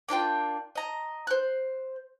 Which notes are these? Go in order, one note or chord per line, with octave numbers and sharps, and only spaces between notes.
A#3 D4 F4 G5
D#5 A#5
C5 F#6